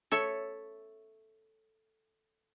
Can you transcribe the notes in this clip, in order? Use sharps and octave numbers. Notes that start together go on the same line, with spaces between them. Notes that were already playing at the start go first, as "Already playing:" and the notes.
A4 C#5 E5